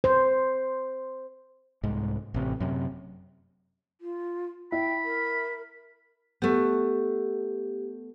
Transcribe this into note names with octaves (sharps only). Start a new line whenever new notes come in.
C5
C2 G#2
A1 C3
F#2 C3
F4
E4 G5 B5
A#4
A3 B3 G4